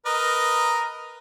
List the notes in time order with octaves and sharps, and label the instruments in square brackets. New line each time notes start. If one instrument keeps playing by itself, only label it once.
[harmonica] A#4 B4 D#5